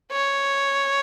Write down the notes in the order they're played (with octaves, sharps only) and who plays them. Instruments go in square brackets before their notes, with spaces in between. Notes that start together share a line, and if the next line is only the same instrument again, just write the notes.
[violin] C#5